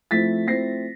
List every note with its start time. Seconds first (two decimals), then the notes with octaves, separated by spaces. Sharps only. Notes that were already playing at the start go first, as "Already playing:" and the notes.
0.11 F3 A3 C4 E4 A6 B6
0.47 F3 A3 C4 E4 A#6 C7